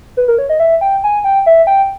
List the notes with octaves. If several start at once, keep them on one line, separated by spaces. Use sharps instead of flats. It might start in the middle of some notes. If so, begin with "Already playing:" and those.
B4
A#4
C#5
D#5
E5
G5
G#5
G5
E5
G5